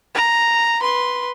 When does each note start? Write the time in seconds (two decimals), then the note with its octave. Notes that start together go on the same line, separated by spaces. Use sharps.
0.15 A#5
0.81 B4 C6